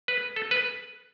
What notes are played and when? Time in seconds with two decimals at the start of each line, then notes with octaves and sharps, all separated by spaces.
0.08 B4
0.36 A4
0.51 B4